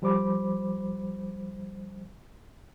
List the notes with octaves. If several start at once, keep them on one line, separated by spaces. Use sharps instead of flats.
F3 G3 C5 B5 D6